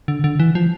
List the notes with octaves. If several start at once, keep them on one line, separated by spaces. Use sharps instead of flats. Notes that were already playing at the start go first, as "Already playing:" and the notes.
D3
D3
E3
F3